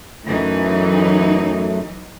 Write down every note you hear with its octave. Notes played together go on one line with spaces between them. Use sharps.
F#2 E3 F#3 A3 D#4